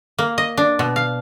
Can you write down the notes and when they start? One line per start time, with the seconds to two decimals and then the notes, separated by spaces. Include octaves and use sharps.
0.19 A#3
0.38 D#5
0.57 D4
0.79 B2
0.96 F5